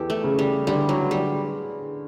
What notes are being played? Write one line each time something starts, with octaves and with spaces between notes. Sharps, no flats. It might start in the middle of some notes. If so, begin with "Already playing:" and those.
Already playing: E2 E3 G4 A4
A3
C#3
G3
D3 G3
F#3
D3 G3